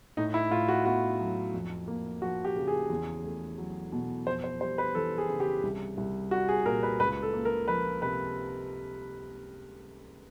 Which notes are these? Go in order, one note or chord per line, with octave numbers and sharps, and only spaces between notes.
A2 D#4
E4
A2 F4
F#4
B3 F#4
F#3
F2
A#3
F3 F#4
G4
C#3
G#4
E2
A3
F#3
B2
F2 C5
C5
G3 C5
B4
E3 A4
G#4
C#3
G4
C2
C2
G3 F#4
G#4
A#2 A#4
B4
C#2 B4
A4
A#3
A#4
F3 B4
C3 B4